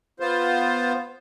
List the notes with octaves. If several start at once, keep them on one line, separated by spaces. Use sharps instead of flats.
B3 F4 C5